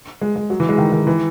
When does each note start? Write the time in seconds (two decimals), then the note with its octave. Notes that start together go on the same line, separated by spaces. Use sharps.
0.21 G#3
0.36 G#3
0.50 F#3
0.60 E3
0.69 G#3
0.78 D#3
0.92 D#3
1.07 E3